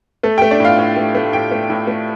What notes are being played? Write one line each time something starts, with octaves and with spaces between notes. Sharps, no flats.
A3 A4
A3 G4 G5
D4 D5
A2 F4 F5
A2
A3
A3
A2 G4 G5
A3
A2
A3